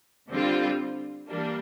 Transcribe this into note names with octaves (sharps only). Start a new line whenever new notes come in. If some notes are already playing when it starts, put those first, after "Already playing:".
D3 G3 C4 F4
E3 G3 A#3 D4